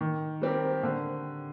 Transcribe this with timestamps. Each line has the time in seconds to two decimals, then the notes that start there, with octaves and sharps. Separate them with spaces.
0.01 D#3
0.42 G3 C4 G4 A#4
0.83 D3